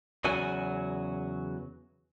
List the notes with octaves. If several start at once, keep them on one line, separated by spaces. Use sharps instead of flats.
E2 C#3 F#3 F#4 G#5